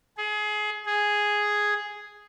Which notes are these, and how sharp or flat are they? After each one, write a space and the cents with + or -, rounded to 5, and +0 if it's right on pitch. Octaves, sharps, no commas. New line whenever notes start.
G#4 +25
G#4 +0